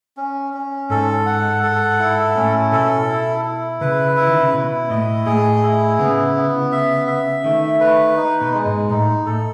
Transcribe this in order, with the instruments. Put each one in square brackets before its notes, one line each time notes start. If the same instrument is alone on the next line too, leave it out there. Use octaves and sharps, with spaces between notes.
[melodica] C#4
C#4
[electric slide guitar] G#2 [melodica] A4
[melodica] F#5
A4
E4
[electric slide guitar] A2 [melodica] C#4
[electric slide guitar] B2 [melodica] A4
[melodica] E4
E4
[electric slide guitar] C#3 [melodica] B4
[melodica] E4
[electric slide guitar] D#3
C#3
[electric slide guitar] B2 [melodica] E4
[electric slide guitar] A2 [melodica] D#5
[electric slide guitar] A2 [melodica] G#4
[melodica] E4
[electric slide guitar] C#3 [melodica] B3
[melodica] B3
E5
E5
[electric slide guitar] D#3 [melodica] A3
[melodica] B4
D#4
[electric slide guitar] B2
[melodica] G#3
[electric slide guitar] G#2
[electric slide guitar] A2 [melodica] D#4
[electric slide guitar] A2 [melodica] A4